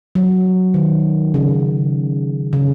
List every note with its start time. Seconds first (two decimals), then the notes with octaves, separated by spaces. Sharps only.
0.15 F#3
0.74 D#3
1.34 C#3
2.53 C#3